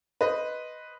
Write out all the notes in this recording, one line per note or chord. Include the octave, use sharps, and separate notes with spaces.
B4 C5 D#5